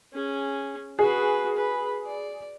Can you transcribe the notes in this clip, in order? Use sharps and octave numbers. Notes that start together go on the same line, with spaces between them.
C#4 G#4
F#4 G#4 B4
B4 B5
D5